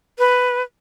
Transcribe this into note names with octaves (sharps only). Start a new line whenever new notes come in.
B4